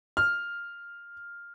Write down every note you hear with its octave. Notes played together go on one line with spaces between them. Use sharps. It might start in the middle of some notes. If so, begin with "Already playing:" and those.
F6